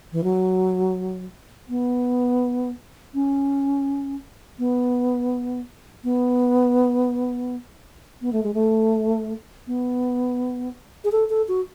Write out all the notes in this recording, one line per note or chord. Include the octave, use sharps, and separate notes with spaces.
E3
F#3
B3
C#4
B3
B3
B3
A3
G#3
A3
B3
G#4
A4
A4
F#4